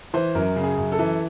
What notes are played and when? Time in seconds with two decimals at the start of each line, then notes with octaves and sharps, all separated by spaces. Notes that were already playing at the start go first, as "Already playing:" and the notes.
0.14 E3 C5
0.35 F#2 A#4
0.56 C#3
0.63 G#4
0.77 F#2
0.92 A4
0.99 E3